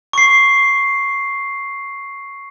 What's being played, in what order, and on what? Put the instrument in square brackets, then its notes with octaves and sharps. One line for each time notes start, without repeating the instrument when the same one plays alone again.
[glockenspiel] C#6 C7